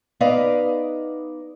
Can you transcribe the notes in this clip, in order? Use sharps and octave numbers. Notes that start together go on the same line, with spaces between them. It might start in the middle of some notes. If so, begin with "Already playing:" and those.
B3 D#4 B4 D5 D#5 F5